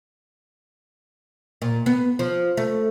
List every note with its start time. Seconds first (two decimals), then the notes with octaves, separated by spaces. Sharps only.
1.62 A#2
1.86 B3
2.19 F3
2.57 A3